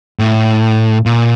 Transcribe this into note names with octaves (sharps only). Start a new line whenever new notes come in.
A2
A#2